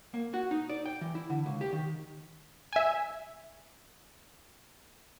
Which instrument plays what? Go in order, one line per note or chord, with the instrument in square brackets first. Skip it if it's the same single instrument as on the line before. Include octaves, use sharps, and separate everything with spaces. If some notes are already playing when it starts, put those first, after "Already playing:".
[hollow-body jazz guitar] A#3
F#4
D#4
D5
G5
E3
E4
D3
C#2
G4
D#3
[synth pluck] E5 G#5